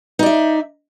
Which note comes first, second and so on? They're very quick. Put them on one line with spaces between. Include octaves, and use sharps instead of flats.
D#4 D5 E5